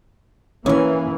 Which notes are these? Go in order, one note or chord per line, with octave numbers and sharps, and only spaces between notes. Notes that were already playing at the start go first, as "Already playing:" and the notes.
E3 A#3 C#4 G#5